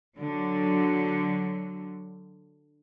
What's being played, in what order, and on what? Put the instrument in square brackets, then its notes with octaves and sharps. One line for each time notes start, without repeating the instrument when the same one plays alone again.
[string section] D3 F#3